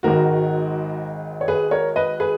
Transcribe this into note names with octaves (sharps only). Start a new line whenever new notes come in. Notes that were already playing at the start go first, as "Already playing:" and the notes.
G#1 G#2 D#3 F#4 A#4
C#5
G#4 B4
A#4 C#5
B4 D#5
G#4 B4